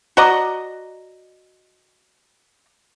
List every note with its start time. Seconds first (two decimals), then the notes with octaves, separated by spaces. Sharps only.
0.17 F#4 D5 D#5 A#5